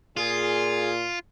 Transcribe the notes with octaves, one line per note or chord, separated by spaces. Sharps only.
A#2 F4 G#4